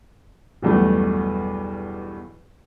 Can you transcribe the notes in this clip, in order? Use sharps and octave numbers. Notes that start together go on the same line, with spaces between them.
B1 E2 G2 B2 A3